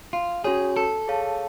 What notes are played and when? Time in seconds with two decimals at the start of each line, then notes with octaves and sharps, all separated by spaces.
0.13 F4
0.44 C#4 F#4 G#4 C#5
0.76 A4
1.08 G#4 C#5 F5 A5